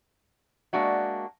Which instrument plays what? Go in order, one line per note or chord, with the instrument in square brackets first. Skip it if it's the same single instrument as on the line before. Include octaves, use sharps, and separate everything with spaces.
[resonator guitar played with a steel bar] G#3 A#3 D4 F#4 E5